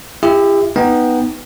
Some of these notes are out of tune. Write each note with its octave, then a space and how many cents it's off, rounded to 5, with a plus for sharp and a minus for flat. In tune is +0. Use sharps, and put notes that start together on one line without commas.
E4 +40 G4 +35 E5 -25
B3 +0 D#4 +0 G5 +10